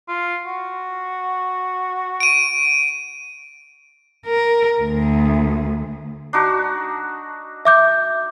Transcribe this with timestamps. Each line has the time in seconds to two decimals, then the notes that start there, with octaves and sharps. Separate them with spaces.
0.09 F4
0.46 F#4
2.20 D7 D#7
4.26 A#4
4.82 D2
6.33 D4 D#4 F#4
7.65 E5 D6 G6